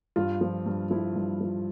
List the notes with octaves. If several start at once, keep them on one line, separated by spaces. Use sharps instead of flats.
G2 F4
F3
G2
F3 E4
G2
F3